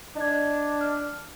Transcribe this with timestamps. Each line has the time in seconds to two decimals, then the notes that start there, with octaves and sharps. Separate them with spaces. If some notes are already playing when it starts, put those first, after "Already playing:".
0.16 D4 D#5 G#6
0.81 F6